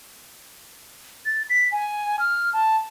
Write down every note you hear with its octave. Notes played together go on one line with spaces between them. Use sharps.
A6
B6
G#5
F6
A5